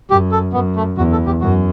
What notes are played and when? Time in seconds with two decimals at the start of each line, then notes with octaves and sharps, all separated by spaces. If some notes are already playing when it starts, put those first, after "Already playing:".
0.10 F#2 G4
0.32 A4
0.53 F#2 B3
0.76 A3
0.97 E2 F#4
1.12 A4
1.26 G4
1.41 F#2 F#4